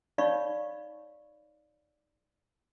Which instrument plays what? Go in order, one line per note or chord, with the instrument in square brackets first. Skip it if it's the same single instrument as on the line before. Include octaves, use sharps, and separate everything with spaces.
[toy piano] D#4 C#5 D5 F5 B5 C#6